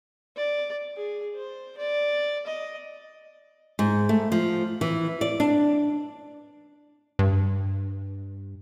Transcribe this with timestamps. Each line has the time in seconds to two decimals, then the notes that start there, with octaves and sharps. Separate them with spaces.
0.36 D5
0.96 G#4
1.35 C5
1.78 D5
2.47 D#5
3.79 G#2
4.09 A3
4.32 F3
4.81 E3
5.21 D5
5.40 D4
7.19 G2